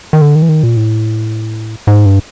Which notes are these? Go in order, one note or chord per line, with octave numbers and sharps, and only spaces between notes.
D#3
D3
D#3
E3
D#3
A#2
A2
G#2
G2